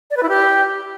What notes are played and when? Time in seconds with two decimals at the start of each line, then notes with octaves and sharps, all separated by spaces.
0.11 D5
0.17 B4
0.23 E4
0.29 G4